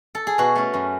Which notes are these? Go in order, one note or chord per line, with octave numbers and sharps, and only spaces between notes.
A4
G#4
B2 F#4
A3 C#4
F#2